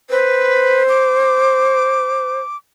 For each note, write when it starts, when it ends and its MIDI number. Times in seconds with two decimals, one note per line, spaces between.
0.10 0.83 71
0.10 2.40 72
0.89 2.57 86